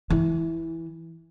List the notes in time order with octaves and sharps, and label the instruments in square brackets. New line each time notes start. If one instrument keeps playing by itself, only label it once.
[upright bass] E3